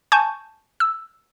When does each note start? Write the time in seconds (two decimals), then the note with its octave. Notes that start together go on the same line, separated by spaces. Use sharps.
0.12 G#5 A5 C#6 G6
0.80 E6